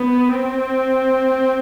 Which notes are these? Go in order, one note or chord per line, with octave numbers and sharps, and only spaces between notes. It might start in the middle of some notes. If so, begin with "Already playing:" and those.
Already playing: B3
C4